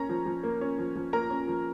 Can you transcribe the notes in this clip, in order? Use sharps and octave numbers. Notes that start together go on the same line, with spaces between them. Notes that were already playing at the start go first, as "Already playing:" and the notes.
Already playing: A#3 C#4 A#5
F3
F3
A#3
C#4
F3
F3
A#3 A#4 A#5
C#4
F3